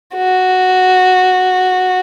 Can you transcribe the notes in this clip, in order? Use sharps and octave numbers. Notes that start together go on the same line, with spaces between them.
F#4